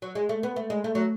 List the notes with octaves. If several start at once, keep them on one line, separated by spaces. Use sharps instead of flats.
F#3
G#3
A3
B3
A3
G#3
A3
F#3